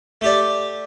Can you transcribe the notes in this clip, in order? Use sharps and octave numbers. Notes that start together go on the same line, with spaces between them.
A3 G4 D5